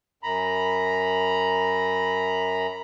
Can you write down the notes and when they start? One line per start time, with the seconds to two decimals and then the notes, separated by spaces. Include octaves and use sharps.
0.23 F#2 A#5 B5